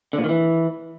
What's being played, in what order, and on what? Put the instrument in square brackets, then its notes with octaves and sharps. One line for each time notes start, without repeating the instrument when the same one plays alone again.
[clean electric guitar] D3
A#2
D#3
E3